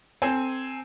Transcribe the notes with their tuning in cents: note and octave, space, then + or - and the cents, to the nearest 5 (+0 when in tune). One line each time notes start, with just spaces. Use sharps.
C4 +0 A4 +25 G#5 +0